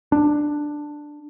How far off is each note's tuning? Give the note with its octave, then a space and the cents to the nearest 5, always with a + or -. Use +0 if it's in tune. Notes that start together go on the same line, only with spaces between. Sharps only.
D4 +10